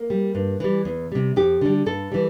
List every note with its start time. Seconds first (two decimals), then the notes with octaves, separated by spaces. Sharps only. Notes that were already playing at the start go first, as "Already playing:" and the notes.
Already playing: A#3
0.10 G3
0.35 G2
0.60 E3 G3
0.85 E2
1.12 C3 G3
1.36 F2 G4
1.61 D3 G3
1.86 G2 A4
2.12 E3 G3